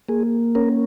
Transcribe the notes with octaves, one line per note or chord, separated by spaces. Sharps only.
A#3 G#4
C#4 A#4